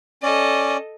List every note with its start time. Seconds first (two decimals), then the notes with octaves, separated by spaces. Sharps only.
0.23 C#4 A4 D5 D#5